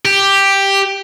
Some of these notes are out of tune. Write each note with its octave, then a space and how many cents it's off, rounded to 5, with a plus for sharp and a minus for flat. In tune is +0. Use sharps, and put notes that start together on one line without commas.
G4 +5